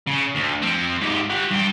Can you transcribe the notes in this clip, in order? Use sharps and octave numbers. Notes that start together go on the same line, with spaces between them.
C#3
D2
F3 C4
G#2 G4
G4 F#5
G2 G5